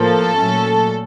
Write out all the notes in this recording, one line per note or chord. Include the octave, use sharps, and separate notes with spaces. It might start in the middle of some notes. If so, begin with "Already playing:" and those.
Already playing: A2 F3 A#3 A4
A#2 F#3 A3 C#4